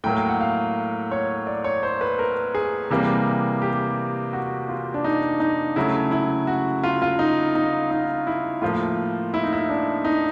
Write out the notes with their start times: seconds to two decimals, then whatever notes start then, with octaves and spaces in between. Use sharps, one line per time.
0.04 A2 F#3 A#3 G5
0.17 G5
0.29 F#5
0.40 F5
1.11 C#5
1.47 D5
1.64 C#5
1.83 C5
2.01 B4
2.19 A#4
2.55 G#4
2.90 C3 E3 G3 A#3
3.62 G4
4.33 F#4
4.69 F4
4.94 D4
5.04 D#4
5.40 D#4
5.76 C#3 F#3 A3 E4
6.11 E4
6.47 F#4
6.83 F4
7.02 F4
7.19 D#4
7.55 D#4
7.91 D#4
8.27 E4
8.62 A2 F3 A#3 F4
9.34 E4
9.43 D#4
9.53 E4
9.69 D4
10.05 D#4